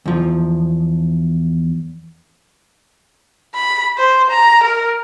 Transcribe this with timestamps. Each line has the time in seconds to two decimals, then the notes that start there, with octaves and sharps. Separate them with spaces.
0.06 E2 F3
3.55 B5
3.97 C5
4.31 A#5
4.63 A#4